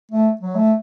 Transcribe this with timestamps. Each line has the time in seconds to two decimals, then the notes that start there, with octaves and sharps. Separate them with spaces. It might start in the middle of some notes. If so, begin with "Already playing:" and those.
0.11 A3
0.41 F#3
0.55 A3